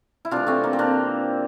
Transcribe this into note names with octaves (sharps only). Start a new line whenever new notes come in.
E4
C3 E3 A3 D4 F4
A3 C4
A#3
C4
A#3 D4